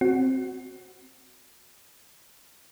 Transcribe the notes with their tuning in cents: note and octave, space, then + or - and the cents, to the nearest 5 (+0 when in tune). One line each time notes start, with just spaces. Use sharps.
C4 +0 F#4 +0